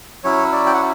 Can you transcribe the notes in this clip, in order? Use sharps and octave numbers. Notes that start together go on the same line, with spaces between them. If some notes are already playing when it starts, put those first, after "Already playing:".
F#3 C#4 E4 C#5
D5
G5
F#5